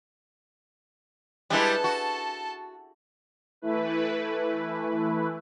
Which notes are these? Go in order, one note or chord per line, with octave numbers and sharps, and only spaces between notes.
G3 G#3 D4 E4 A4 B4 A5
F#4
E3 A3 E4 B4